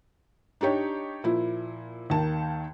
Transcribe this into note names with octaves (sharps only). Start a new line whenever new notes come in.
D4 D#4 G4 C#5
A#2 F3 E4
D#2 D#3 A5